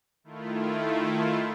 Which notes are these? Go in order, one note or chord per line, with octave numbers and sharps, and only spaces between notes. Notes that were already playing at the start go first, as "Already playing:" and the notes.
D#3 A3 E4 F4